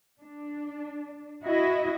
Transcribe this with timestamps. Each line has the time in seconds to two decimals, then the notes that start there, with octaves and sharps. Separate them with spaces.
0.21 D4
1.43 E4 F#4 D#5